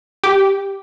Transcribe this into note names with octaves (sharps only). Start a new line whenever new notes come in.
G4